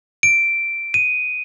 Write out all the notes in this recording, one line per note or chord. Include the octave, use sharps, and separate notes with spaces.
D7
D#7